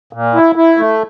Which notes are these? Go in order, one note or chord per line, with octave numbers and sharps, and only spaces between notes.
A#2
E4
E4
A3